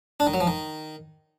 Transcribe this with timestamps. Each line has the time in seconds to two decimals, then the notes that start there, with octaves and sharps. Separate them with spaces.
0.20 D4
0.27 D#3
0.34 F#3
0.40 F3
0.47 D#3